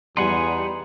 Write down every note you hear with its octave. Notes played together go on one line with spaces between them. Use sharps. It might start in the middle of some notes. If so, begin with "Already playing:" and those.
E2 G3 D#4 F#5 G#5 C6